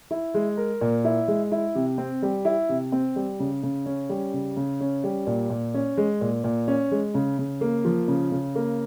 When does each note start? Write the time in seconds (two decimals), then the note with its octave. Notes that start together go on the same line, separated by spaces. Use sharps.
0.11 E4
0.34 G#3
0.57 A#4
0.81 A#2
1.05 E4
1.28 G#3
1.52 E4
1.75 C3
1.98 C4
2.22 G3
2.45 E4
2.69 C3
2.92 C4
3.16 G3
3.40 C#3
3.63 C#3
3.86 C#4
4.09 G3
4.33 C#3
4.56 C#3
4.80 C#4
5.04 G3
5.27 A#2
5.50 A#2
5.74 C#4
5.97 G#3
6.21 A#2
6.44 A#2
6.68 C#4
6.91 G#3
7.14 C#3
7.38 C#3
7.61 A#3
7.85 F3
8.08 C#3
8.31 C#3
8.55 A#3